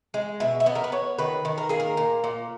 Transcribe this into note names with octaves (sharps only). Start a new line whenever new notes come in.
G#3
B2 E5
E5
B3 D#5
A#4
B4
B3 C#5
D#3 B4
D#3
A#4
A#3 G#4
A#4
A#2
A#2